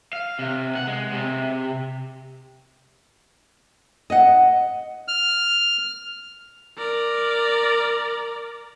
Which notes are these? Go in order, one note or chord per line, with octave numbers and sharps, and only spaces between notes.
F5
C3
F#5
G#3
C3
D#5 F#5
F6
A#4 D5